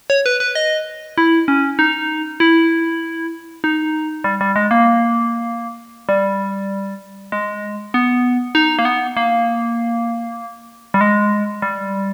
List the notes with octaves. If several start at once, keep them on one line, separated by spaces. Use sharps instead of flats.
C#5
B4
B4
D#5
E4
C#4
D#4
E4
D#4
G3
G3
G#3
A#3
G3
G#3
B3
D#4
A#3
B3
A#3
G3
G#3
G3